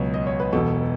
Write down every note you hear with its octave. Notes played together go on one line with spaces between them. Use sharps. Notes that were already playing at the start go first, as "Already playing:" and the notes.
Already playing: C#2 B2 F#3
D#5
C#5
B4
E1 E2 B2 A4